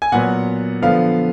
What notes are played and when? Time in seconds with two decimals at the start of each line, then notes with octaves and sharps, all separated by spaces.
0.02 G#5
0.12 A#2 F#3 B3 F#5
0.82 D3 F3 B3 F5